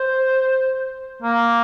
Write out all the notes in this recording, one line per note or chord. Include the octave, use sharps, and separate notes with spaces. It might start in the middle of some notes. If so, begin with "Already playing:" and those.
Already playing: C5
A#3